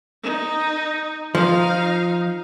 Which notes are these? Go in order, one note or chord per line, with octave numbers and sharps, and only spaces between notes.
D#4
F3 D#4 F5